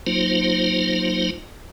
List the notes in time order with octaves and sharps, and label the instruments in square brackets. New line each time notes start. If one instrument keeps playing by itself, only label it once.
[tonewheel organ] F#3 A#3 D#4 F4 C5